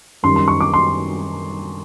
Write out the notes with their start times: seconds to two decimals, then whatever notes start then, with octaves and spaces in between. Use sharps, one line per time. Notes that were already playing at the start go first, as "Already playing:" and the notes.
0.23 F#2 D#3 G3 C6
0.36 C6
0.48 C#6
0.61 D6
0.74 C6